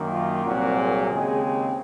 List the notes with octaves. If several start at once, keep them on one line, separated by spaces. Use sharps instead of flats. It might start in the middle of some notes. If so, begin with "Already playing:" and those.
Already playing: F#2 D#3 A#3
F4
C2 A#2 F#3 C4 F#4
G#4
D#2 C#3 G#3 C4
G#4